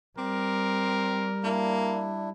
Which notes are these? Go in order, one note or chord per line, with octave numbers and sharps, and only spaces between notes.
G3 C4 A#4 D6
A#3 D4 E4